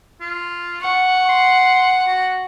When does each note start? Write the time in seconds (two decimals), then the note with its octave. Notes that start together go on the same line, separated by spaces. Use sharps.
0.21 F4
0.81 F#5 C#6
1.29 C6
2.07 F#4